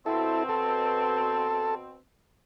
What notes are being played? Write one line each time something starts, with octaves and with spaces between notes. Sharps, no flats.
B2 C4 E4 A4
A4